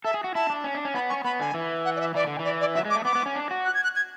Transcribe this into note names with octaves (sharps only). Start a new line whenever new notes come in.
A4 E5
G#4
F#4
E4 A5
D4
C#4
D4
C#4
B3 B5
C#4 C#6
B3 B5
D3 G#5
E3
F#5
D5
E5
E3 D5
D3
E3
D5
D5
F#3 E5
G#3 D6
A3
B3 D6
B3
C#4
D4
F#4
F#6
G#6
F#6
G#6